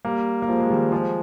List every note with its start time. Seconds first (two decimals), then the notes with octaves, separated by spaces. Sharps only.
0.05 G3 A#3
0.42 A#3
0.48 F3 G#3
0.60 G#3
0.70 D#3 G3
0.92 F3 G#3